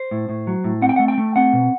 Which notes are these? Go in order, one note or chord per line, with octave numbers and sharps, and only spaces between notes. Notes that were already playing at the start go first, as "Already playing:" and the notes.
Already playing: C5
A2
A2
F#3
A2
C4 F#5
G5
A3 F#5
G5
A3
C4 F#5
B2